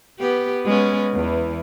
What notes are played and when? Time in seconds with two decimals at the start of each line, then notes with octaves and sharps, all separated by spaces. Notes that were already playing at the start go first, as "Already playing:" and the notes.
0.19 B3 G4
0.65 G#3 B3 C#4
1.14 E2 E3